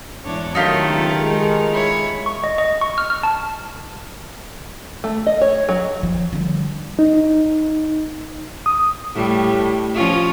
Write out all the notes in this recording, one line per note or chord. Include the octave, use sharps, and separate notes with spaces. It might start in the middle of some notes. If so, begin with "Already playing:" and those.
E2 G#2 D4 C#5
D#3 F#3 A3 D#4 F4 G4 A4 A#4
C#2
G#3
E4 C#5
C#6
D#5
D#5
C#6
F6
F6
A5
A3
D#5
C#5
F#3
F3
D3 G3
D#4
D#6
A2 G3
F3 C#4 F4